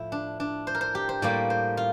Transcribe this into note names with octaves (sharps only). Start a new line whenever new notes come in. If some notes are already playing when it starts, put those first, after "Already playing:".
Already playing: A2 F3 E4
D4
D4
C5
A#4
C5
G4
C5
A2 G3 A#3 D5
C5
F4